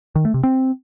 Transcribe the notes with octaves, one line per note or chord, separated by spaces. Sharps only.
D#3
A3
C3
C4